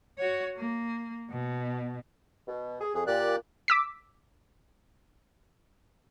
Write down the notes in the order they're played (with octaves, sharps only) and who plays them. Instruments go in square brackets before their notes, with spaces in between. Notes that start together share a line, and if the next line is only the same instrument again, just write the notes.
[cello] F#4 C#5
A#3
B2
[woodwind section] B2
G#4
[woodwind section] F2 [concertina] G#4
[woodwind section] A#2 [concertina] G4 D5 F#6
[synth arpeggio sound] D6 E6 B6